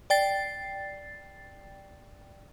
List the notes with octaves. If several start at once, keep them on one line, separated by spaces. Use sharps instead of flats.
D5 G5 A6 C7